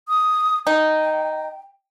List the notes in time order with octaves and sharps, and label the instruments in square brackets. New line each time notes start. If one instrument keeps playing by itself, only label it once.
[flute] D#6
[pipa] D#4 [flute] G5